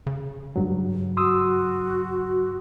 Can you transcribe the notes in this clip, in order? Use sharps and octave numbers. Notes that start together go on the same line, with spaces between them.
C#3
G2 F#3
F#4 C6 D#6 E6